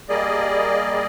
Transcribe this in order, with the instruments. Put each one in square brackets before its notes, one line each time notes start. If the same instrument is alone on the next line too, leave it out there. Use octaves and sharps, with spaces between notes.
[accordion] G3 A#3 G#4 D5 D#5